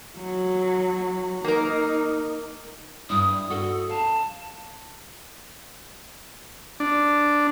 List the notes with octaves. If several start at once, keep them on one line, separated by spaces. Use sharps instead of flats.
F#3
A#3 D#4 A#4
G2 E4 D#6
F#4 A4
F5 A5
D4